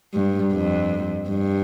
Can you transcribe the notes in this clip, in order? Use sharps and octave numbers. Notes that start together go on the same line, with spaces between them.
G2
F2
G2